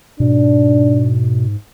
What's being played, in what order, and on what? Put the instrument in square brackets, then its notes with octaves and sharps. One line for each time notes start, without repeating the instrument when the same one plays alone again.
[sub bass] G#2 [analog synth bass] B2 [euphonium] D4